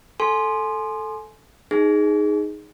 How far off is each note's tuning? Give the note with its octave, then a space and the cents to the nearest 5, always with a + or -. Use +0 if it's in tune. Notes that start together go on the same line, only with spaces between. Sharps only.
A4 +0 G#5 +25 C6 +0
D#4 +0 G#4 +0